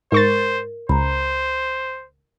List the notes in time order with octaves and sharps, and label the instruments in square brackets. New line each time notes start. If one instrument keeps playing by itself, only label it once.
[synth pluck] G#2 C#6 A6 [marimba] A#4 [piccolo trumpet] C5
[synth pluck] C#2 [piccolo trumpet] C5 [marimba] A#5 B5